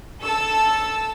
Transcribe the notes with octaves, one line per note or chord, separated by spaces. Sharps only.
A4 A5 E6